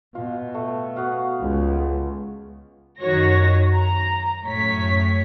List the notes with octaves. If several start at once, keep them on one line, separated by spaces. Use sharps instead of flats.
B2 F4
A3
B3 F#4 F5
C#2
F#2 D#3 F#4 C#5 A#6
A#5
F#2 A2 C#5 B6